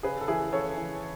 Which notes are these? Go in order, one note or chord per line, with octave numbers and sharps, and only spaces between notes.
C#3 G#4 B4
A4
E3 E4 G#4
C#3 A4 C#5
E3